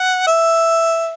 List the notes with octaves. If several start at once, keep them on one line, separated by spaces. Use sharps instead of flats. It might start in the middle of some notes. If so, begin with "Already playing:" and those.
Already playing: F#5
E5